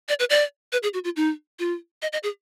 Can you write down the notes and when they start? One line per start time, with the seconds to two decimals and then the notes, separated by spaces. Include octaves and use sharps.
0.09 D5
0.20 B4
0.30 D5
0.72 B4
0.83 G#4
0.94 F#4
1.04 F4
1.16 D#4
1.59 F4
2.02 D#5
2.13 D#5
2.23 G#4